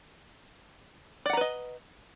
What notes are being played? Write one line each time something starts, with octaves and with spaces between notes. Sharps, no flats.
B4 D5 D#5 F#5 A#5